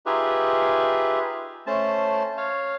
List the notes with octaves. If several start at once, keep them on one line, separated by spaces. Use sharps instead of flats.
D#4 F4 G4 G#4 B4 E5
A3 C#4 C5 A5
C#5 F5